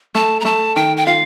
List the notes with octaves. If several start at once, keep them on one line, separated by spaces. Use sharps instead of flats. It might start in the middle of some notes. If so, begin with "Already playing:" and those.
A3 A5
A#5
A3 A5
D#3 G5
G5
F4 F5